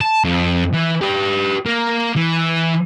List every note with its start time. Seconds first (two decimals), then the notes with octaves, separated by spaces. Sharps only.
0.01 A5
0.24 F2
0.73 E3
1.02 G4 B4
1.66 A#3
2.16 E3